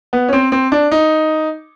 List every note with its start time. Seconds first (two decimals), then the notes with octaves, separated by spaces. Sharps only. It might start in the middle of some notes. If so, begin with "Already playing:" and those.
0.13 B3
0.29 C#4
0.33 C4
0.52 C4
0.72 D4
0.91 D#4